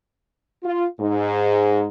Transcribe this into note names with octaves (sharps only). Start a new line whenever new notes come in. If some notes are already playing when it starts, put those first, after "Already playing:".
F4
G#2